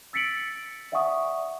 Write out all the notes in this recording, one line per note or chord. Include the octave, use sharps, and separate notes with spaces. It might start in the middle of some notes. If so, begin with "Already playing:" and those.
E6 A6 B6 C#7 D7 F#7
D5 E5 F#5 G#5 C#6 D#6